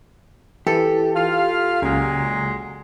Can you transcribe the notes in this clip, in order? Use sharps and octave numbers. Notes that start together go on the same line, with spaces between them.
E3 G4 A4
F4 F5
C#2 A#2 F#3 G#3